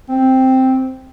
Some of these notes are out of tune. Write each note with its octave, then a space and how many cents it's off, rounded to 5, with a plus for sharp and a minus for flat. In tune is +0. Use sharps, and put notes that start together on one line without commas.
C4 +0